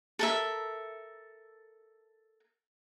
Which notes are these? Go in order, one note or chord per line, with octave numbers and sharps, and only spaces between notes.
A4 A#4 E5